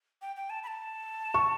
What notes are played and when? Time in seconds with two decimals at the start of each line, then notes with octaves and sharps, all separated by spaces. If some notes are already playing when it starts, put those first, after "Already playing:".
0.22 G5
0.36 G5
0.50 A5
0.63 B5
0.67 A5
1.34 C#6